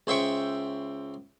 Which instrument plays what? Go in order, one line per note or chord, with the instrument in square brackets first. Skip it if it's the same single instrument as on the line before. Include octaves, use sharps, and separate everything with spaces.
[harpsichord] C#2 C5 E5 G5 C#6